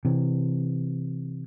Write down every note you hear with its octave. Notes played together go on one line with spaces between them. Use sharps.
C3 E3